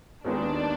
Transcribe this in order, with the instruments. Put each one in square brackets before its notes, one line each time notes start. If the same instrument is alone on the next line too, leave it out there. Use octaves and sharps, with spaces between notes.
[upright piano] D#2 D#3 G#3 B3 D#4 [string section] D4